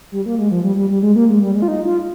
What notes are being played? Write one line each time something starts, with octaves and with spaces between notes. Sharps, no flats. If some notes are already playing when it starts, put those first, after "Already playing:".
G3
A#3
G#3
F3
G3
G3
G3
G#3
A#3
G#3
G3
G#3
F4
D#4
F4